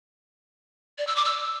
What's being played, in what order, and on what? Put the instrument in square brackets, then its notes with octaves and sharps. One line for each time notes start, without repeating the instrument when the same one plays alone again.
[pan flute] D5
E6
D6
E6